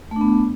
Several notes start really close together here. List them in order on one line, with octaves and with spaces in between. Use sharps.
A3 D4 B3